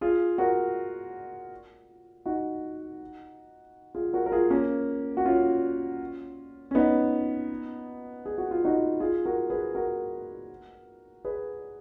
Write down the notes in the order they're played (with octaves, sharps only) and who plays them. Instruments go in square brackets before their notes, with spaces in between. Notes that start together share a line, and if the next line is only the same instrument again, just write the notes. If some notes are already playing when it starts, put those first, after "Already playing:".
[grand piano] F4 G#4
F#4 A#4
D#4 F#4
F4 G#4
F#4 A#4
A#4
F4 G#4
A#3 C#4
F#4
C#4 F4
C#4
B3 D#4
G#4
F#4
F4
D#4 F#4
F4 G#4
F#4 A#4
G#4 B4
F#4 A#4
G#4 B4